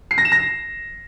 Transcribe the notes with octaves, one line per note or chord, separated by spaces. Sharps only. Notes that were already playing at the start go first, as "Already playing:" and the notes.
C7
A#6
E7
A#6